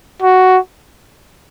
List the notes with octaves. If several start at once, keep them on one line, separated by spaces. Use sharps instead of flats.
F#4